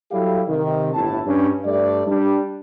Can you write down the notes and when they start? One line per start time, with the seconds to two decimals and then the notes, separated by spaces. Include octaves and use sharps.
0.11 F#3 G3 E4 G4 A4 F5
0.47 C3 D#3
0.93 G1 A2 E4 A5
1.26 G2 C#4 D4
1.65 G2 A3 D5
2.07 G3 D4